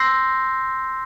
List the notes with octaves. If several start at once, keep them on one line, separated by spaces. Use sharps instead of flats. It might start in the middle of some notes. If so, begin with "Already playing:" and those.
Already playing: C6 E6 G6 A#6 C7